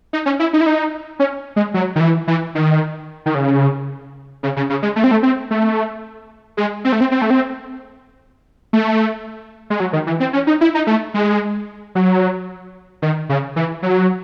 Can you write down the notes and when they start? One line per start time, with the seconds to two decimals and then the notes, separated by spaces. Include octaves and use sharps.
0.13 D#4
0.26 C#4
0.40 E4
0.53 D#4
0.61 E4
0.66 D#4
1.19 C#4
1.56 G#3
1.74 F#3
1.96 D#3
2.00 E3
2.28 E3
2.55 D#3
3.26 D#3
3.35 C#3
4.43 C#3
4.57 C#3
4.70 C#3
4.83 G#3
4.96 A3
5.04 C4
5.11 A3
5.23 C4
5.51 A3
6.57 G#3
6.85 C4
6.92 A3
7.01 C4
7.11 C4
7.22 A3
7.30 C4
8.73 A3
9.70 G#3
9.80 F#3
9.93 D#3
10.07 E3
10.20 C4
10.33 C#4
10.47 D#4
10.61 E4
10.75 D#4
10.87 A3
11.14 G#3
11.95 F#3
13.02 D#3
13.29 C#3
13.56 E3
13.83 F#3